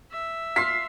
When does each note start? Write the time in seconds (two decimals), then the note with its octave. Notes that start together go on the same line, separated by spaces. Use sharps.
0.11 E5
0.56 F5 C6 B6